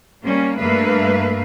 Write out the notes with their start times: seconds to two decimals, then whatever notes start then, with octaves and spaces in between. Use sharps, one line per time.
0.21 G3 A#3 C#4
0.59 G2 A3 A#3 B4 E5 F5